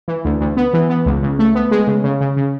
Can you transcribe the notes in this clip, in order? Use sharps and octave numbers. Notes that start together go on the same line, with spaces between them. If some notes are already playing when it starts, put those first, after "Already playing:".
E3
D2
D2
B3
E3
B3
C#2
C#2
A3
B3
G#3
C#3
C#3
C#3
C#3